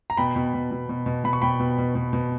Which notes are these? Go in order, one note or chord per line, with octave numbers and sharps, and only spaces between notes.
A#5
B2 G5 B5
B2
B2
B2
B2
B2
B2 B5
C#6
B2 G5 B5
B2
B2
B2
B2